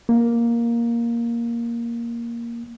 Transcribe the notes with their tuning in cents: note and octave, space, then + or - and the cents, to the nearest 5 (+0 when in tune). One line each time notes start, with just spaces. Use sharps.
A#3 +5